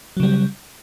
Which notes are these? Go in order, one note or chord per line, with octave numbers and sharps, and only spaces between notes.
C#3 F#3 G3